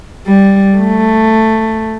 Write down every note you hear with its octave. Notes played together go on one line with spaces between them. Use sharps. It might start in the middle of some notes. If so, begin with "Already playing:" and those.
G3
A3